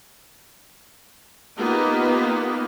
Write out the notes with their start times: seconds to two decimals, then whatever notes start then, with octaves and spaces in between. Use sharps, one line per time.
1.57 A#3 B3 D#4 F4 G4